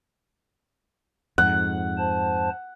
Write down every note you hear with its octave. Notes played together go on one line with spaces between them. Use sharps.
F2 G#2 F#5
C5 A5